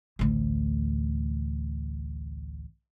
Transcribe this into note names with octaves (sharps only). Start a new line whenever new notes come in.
A1 D2